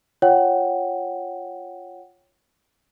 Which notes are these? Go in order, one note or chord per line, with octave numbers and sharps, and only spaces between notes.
F4 C#5 F#5 G5